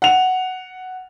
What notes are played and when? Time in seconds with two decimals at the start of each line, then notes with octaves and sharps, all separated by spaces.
0.02 F#5 F7